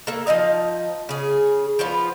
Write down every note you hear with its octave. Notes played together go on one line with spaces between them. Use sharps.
A#3 A4
F3 D#4 D#5 F5
C#3 G#4
F3 B3 F4